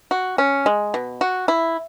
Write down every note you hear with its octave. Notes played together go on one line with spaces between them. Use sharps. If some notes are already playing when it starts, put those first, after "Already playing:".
F#4
C#4
G#3
B2
F#4
E4